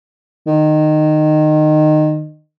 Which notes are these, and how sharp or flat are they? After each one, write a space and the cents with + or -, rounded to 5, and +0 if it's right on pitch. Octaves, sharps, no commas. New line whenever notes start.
D#3 -20